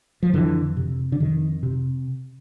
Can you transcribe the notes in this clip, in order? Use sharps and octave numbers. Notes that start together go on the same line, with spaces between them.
F3
F2 D3 E3
C3
D3
F2 D#3
C3